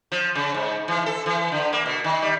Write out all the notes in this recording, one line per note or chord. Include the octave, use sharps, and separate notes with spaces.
F3
C#3
G#2
E3
A4
E3
D3
A#3
B2
D#3
G3